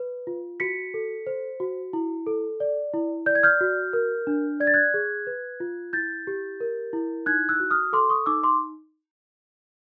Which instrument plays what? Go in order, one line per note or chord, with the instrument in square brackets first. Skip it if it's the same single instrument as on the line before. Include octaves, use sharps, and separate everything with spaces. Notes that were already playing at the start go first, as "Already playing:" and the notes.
Already playing: [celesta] B4
F4
F#4 B6 C#7
A4
C5
F#4
E4
A4
D5
E4
D5 G6
G#6
F6 G6
F#4
A#4
D4
D5 G#6
A6
F#6 G#6
G#4
B4
F4
E4 G6 A6
G4
A#4
E4
D#4 F#6 G#6
E6 F#6
F#4
D#6 F6
A4 C6 D6
C#6 D#6
D#4 D6 E6
C6 D6